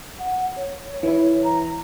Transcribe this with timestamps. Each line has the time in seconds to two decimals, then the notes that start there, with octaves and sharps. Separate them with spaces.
0.19 F#5
0.56 C#5
1.03 E3 E4
1.44 A#5